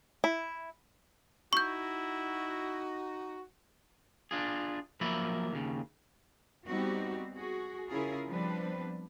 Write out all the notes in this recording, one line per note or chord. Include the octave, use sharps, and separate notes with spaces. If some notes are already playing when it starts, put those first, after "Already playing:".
E4
D#4 E4 F#4 C#6 G6
D4 F4 G#4
F3 F#3 A#3 E5 B5
D#2 C#3
G3 B3 C4 D#4 F#4 G4
F#4 G#4
C#3 C#4 E4 F4 G#4 A#4
F3 G3 B3 C4 D4 B4